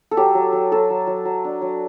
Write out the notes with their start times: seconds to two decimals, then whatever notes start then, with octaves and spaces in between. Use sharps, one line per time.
0.11 A4
0.17 F#3 G4
0.35 F#3
0.53 F#3
0.72 F#3 A4
0.90 F#3
1.07 F#3
1.25 F#3
1.45 D4
1.62 F#3